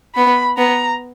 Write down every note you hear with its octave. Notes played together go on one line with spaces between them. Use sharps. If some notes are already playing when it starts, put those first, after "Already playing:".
B3 B5
B3 A#5